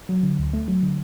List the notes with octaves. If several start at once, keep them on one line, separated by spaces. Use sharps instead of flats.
F#3
D3
D2
A3
F#3
D3